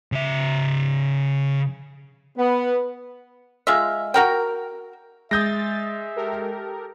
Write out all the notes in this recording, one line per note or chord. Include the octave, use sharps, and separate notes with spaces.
C#3 E5
B3
G#3 F4 D#5 E5
F#4 A#4 G5
G#3 E5 D#6 G6 A6 A#6
G4 A4 A#4